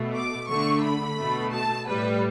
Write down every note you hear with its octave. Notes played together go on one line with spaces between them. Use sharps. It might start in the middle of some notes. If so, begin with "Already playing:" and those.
Already playing: B2 A3
D6
D3 A3 C#6
B5
B2 A3
A5
A2 G3 B4